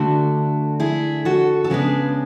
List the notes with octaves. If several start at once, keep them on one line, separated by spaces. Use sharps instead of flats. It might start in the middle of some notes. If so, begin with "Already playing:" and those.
Already playing: D3 A3 D4 F#4
E4 G#4
F#4 A4
A4
C#3 G#3 B3 D4 G#4 B4